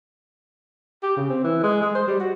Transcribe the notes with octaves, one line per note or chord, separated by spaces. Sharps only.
G4
C#3
C4
E3
G#3
G#3
C5
G3
F#4